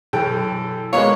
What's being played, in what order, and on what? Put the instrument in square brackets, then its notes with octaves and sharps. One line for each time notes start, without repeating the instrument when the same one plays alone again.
[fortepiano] F#2 E3 G5 [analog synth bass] B2 [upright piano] A4
[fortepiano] A#2 B3 A#4 [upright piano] G#3 F5 [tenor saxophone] C#5